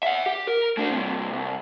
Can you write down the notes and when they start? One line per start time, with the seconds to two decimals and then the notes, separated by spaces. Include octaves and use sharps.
0.03 E5 F#5
0.26 G4
0.47 A#4
0.77 A3 D4
0.91 G2 C3
1.32 C2